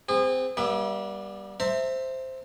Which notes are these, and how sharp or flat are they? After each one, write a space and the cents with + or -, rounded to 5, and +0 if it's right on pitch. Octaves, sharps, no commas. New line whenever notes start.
C4 -20 G#4 -40
G3 +0 B3 -45 E5 +10
C5 +0 E5 +0 A#5 -45